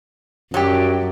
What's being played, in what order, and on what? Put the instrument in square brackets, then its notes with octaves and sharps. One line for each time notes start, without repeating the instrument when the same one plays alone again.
[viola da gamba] F#2 [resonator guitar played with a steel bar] F#3 G3 G4